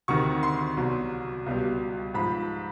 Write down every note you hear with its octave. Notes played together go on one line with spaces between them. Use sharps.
D2 C3 D#3 C#6
C6
C2 B2 F#3
C#2 B2 G3
G#2 F3 B5